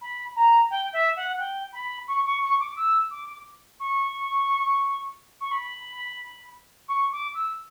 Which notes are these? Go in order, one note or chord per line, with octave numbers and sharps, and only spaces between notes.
B5
A#5
G5
E5
F#5
G5
B5
C#6
C#6
C#6
D6
E6
D6
C#6
C#6
B5
C#6
D6
E6